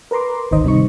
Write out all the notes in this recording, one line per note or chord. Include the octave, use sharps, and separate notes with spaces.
A#4 B4 A#5 C6 D6
G#1 D2 D#3 C5 D#5
C3 G3 D#4 C#6